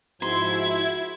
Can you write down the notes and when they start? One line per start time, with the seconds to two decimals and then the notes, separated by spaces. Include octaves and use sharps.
0.22 G#2 F3 E4 F#4 C6 G#6